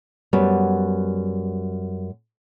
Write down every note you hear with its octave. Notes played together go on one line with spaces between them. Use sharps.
F#2 G3 B3